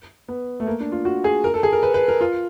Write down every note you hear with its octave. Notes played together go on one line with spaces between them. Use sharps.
B3
A3
A#3
D4
F4
F#4
G#4
A#4
A4
G#4
A#4
B4
B4
A#4
F4